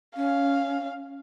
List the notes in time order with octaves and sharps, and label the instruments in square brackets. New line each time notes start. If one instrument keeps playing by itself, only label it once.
[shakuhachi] C#4 [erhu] F5